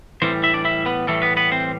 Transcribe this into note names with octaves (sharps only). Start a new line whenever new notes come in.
A2 E3 G3 C4 C5
E4 E5
D4 D5
E4 E5
B3 B4
A2 E3 G3 A3 A4
B3 B4
B3 B4
C4 C5